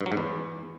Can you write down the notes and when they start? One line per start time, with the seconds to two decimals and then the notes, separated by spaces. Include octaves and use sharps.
0.01 G2
0.06 F#3
0.12 G#2
0.17 E2